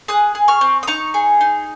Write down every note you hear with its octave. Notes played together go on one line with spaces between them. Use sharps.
G#4 D#6 F#6
G#4
C#6 F6
C4
D#6
D#4 A#5 C#6
G#4
D#4